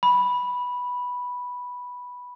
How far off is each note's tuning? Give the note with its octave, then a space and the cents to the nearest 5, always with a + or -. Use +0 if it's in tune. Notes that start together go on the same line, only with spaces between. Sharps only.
B5 -5